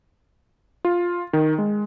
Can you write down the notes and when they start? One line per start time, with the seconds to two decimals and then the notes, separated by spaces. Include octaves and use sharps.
0.85 F4
1.33 D#3
1.58 G#3